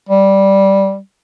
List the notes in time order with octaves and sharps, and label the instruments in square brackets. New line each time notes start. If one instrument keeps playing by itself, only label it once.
[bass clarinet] G3